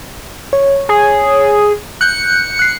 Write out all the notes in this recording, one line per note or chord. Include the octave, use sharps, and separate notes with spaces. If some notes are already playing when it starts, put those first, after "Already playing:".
C#5
G#4
F#6 G6 C#7
F#6 C7